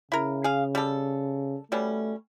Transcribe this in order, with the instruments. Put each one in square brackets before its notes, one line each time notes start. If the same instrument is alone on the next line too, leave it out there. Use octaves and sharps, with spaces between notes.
[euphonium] C#3 [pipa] E4 A#4
[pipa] G#4 F5
G3 A4
[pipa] B2 G3 C#4 [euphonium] A3